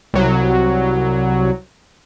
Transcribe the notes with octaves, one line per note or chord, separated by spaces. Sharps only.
C2 F#3